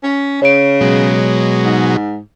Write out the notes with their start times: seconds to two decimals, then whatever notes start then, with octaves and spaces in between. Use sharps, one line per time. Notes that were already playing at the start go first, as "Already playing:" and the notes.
0.03 C#4
0.42 C#3 C#5 D7
0.81 B2 F#3 G#3
1.65 G#2